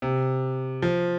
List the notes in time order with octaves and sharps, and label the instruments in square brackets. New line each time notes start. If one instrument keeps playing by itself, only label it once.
[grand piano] C3
F3